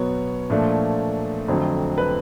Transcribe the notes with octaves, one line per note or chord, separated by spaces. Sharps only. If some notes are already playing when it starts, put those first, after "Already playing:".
Already playing: B2 F#3 B3 C#5
A#2 F3 A3 D4
F2 D3 F#3 A3 C4
B4